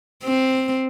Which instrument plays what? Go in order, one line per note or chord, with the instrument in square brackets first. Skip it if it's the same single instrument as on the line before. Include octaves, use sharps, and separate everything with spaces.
[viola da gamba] C4